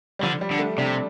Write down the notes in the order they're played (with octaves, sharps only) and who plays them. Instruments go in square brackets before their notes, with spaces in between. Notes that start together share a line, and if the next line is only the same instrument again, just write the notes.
[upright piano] G3
[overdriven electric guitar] D3 [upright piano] F3
[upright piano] G3
[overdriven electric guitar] D3
[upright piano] A3
[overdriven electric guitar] C3 [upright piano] D4